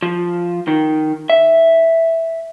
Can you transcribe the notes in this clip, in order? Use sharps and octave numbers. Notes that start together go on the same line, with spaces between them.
F3
D#3
E5